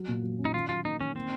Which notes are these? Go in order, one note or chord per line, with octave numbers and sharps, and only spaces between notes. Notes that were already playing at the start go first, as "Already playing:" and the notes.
Already playing: F#3
A#2
F#3
C#4
D#4
D#3 F4
F#3 F4
A#3 D#4
D#3 C#4
A#3 C4